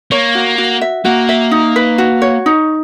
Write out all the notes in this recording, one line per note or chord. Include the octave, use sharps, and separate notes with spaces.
A#3 C#5
F#4
F#4
E5
A#3 F#4
E5
D#4
B4
F#4
C#5
D#4